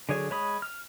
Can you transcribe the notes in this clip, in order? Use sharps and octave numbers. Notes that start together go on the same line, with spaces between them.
D3 F#3 G#4 C#5
G#3 C#5 B5 D#6
F6